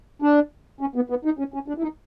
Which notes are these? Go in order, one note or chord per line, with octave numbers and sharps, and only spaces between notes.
D4
C#4
B3
B3
D#4
C#4
C#4
D4
E4
D#4